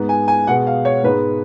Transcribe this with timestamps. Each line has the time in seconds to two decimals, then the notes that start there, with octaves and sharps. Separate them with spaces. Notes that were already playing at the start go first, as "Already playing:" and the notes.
Already playing: G#2 G#3 B3
0.09 G#5
0.28 G#5
0.47 B2 G#3 B3 F#5
0.67 F5
0.85 C#5
1.04 G#2 G#3 B3 B4